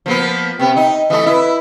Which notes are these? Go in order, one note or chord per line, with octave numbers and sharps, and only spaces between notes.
F3 A#3 B3
C3 B3 G5
D#4
E3 A3 D#5 E5 D#6
E4 B4